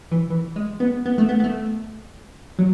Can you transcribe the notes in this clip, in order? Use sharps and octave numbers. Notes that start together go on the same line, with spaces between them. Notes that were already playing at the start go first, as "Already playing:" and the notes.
E3
E3
G#3
B3
B3
A3
B3
B3
A3
F#3